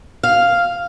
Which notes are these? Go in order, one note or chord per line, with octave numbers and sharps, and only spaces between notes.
F5